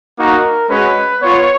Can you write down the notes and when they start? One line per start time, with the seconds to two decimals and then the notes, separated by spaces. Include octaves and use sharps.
0.17 A#3 D#4 F#4 A#4
0.69 G#3 C#4 F#4 B4
1.22 B3 F4 C#5